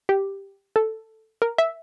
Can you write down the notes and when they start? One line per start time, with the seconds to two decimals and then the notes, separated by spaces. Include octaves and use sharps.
0.09 G4
0.76 A4
1.42 A#4
1.58 E5